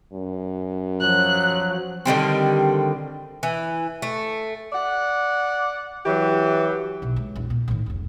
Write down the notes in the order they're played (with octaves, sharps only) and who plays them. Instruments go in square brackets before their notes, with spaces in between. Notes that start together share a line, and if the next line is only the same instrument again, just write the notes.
[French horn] F#2
[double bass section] F3 [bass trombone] F#3 [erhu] F#6
[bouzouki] D3 D#3 G3 C4
E3
A3
[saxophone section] D5 F#5
E3 F#3 G4
[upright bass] B1 B2
G#3
A#1 E2
A#2 B3
A2 D#3
F1 C#2